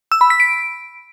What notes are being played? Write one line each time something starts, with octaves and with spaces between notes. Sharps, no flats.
E6
B5
B6
D7